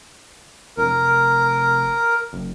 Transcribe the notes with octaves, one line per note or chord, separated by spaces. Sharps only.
F1 A#4
F#1